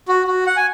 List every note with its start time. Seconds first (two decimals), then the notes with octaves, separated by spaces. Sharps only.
0.08 F#4
0.27 F#4
0.47 F#5
0.56 G#5